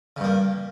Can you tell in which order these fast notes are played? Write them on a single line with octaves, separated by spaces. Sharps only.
C#3 G2 A#3